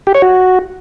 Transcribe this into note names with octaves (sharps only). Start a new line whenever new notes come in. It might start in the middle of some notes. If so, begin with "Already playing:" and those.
G4
C#5
F#4